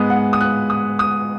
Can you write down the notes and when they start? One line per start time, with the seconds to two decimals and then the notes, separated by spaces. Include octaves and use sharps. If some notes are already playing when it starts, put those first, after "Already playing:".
Already playing: G#2 G#3 B3 D#6
0.10 F#5
0.33 D#6
0.41 F#6
0.70 D#6
0.99 D#6